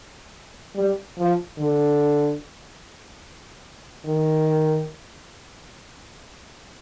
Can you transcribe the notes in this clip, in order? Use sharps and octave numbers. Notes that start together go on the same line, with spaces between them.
G3
F3
D3
D#3